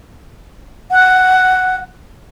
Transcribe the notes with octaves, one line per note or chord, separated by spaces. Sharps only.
F#5